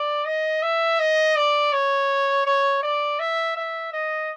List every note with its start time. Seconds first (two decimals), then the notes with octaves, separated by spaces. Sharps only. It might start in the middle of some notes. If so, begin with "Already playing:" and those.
Already playing: D5
0.25 D#5
0.63 E5
0.99 D#5
1.36 D5
1.72 C#5
2.46 C#5
2.83 D5
3.19 E5
3.56 E5
3.93 D#5